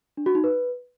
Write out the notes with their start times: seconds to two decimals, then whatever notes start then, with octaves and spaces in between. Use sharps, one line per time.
0.17 D4
0.26 F#4
0.35 D#4
0.44 B4